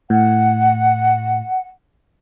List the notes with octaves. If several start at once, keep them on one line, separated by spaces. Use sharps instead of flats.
A2 F#5